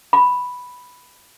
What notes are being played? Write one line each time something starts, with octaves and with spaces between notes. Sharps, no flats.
B5